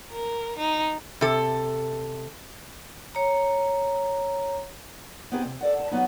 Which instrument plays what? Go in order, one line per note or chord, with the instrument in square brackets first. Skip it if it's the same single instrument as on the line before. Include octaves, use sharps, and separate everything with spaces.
[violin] A#4
D#4
[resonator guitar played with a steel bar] C3 A4
[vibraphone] C#5 A#5
[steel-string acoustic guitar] B3 C4 D#4 G4 G#4
C3
A4 D5 F#5
A5
F#3 B3 D#4